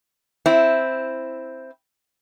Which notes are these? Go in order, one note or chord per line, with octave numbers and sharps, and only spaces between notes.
C4 E4